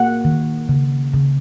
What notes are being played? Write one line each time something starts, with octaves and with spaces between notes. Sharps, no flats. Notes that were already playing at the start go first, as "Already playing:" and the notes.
Already playing: A#3 F#5
D#3
C#3
C#3